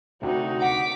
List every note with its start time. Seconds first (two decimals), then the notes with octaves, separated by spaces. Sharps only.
0.22 D2 C3 D#4 F#4
0.62 F#5 D6 B6